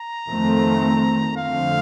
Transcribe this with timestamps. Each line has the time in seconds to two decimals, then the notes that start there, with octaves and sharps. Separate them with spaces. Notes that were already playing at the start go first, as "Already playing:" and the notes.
Already playing: A#5
0.28 F2 D#3 A3 C4
1.37 F2 D3 A3 C4 F5